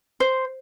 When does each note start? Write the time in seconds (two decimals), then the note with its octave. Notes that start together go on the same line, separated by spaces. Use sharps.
0.20 C5